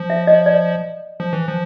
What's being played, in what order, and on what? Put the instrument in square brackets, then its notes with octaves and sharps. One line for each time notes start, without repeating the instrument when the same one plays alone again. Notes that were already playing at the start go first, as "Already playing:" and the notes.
Already playing: [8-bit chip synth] F3
[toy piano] E5
D#5
D5
[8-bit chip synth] F3
E3
F3